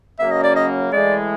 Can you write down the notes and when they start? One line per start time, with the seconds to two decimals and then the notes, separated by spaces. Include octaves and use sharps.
0.19 F#2 C#3 F#3 A#3 C#4 E5
0.31 D#5
0.44 D5
0.56 D#5
0.92 A2 E3 G#3 D5